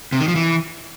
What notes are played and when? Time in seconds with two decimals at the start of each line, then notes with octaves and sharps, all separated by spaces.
0.12 C3
0.20 D#3
0.28 F3
0.35 E3